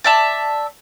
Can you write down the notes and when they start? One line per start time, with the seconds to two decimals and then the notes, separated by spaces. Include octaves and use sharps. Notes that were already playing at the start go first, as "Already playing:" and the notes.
0.04 D5 E5 A5